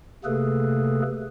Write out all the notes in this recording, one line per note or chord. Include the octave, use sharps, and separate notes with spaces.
C3 A3 A#3 G#4 A4 B4